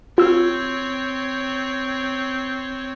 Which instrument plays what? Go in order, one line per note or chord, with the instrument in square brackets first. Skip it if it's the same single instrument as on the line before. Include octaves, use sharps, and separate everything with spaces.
[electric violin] C4 C#5 [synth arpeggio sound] F4 E6